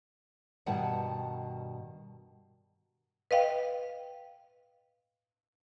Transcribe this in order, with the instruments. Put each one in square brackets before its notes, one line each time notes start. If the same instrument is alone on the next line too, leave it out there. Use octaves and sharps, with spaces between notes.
[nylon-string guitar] G2 B2 D#3 G3 F#5 A5
[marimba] B4 D#5 F5 G5